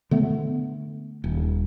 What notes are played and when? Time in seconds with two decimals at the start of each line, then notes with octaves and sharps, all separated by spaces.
0.11 D3 A3 B3
1.24 D#1